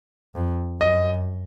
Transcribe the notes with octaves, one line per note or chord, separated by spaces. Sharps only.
F2
F#2 D#5